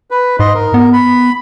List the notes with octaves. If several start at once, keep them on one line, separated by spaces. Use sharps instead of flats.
B4
G#2 D#5 C6
A#4
B3
B5